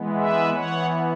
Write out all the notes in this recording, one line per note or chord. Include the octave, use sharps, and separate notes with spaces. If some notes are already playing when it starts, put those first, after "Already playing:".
Already playing: E3 G#3 B3
B4 E5
E3 B3 C#5 F#5